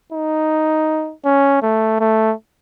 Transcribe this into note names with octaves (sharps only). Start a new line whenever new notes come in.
D#4
C#4
A3
A3